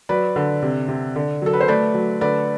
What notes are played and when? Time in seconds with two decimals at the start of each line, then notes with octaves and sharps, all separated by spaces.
0.09 F#3 B4 D5
0.36 D3
0.62 C3
0.88 C3
1.16 D3
1.42 F#3 A4
1.53 B4
1.61 C5
1.68 A3 B4 D5
1.94 F#3
2.21 D3 B4 D5